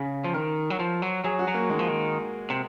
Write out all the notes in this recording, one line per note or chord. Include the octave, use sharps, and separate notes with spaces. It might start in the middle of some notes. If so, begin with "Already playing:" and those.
Already playing: C#3 G#4
F3
D#3 A#4
F#3
F3
F#3
F#3 G#4
F#4
F#3
A#3
D#3 G#3
F3
D#3
C3